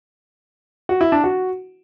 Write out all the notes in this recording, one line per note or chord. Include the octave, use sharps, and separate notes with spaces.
F#4
E4
D4
F#4